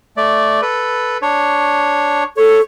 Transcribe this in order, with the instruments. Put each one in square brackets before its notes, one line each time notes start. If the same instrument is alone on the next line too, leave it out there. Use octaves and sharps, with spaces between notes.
[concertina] A3 D5
A4 B4
D4 C#5
[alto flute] A4 [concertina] C#5